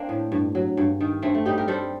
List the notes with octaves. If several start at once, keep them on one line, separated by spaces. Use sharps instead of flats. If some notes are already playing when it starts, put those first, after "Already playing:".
Already playing: A#3 C4 D4 C5
A2
G2
F#3
G2
D#3
G2 A3 C4
A3
G3 D#4 G4
G4 A#4
G3 A4 C5